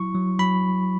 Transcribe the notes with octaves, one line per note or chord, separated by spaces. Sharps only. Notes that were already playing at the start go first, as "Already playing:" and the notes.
Already playing: F#3 E4 C#6
F#3
F#3 B5